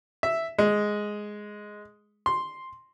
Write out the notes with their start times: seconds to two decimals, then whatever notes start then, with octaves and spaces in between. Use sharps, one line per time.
0.23 E5
0.59 G#3
2.26 C6